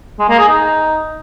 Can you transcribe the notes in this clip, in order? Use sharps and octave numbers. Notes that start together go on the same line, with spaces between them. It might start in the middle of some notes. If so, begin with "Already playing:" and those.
G#3
A#3
G#4
D#4